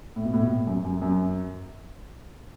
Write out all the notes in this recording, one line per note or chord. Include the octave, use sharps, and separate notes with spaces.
A2
B2
A2
B2
A2
F#2
F#2
F#2